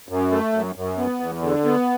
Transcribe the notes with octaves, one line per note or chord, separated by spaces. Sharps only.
F#2
A3
F#2
F#2
B3
E2
D3
B3